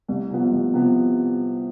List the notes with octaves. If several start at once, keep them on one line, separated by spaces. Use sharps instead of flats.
C2
C3 F3 B3
C2
C3 F3 B3